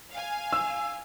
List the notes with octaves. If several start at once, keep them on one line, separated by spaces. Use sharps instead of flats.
F5 G#5
E6